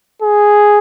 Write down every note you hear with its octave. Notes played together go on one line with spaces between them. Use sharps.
G#4